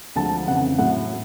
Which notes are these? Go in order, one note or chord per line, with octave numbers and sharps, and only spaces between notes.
D2 D3 F3 G#3 A5
F2 C#3 E3 F#5
A2 F#3 A3 F#5